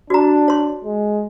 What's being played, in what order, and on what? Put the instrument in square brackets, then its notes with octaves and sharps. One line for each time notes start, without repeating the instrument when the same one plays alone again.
[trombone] D4 [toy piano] F#4 A#5
[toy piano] C#5 C6
[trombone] G#3